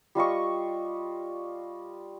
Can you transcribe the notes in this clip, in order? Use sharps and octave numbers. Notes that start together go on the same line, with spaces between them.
G3 F4 D#5 C#6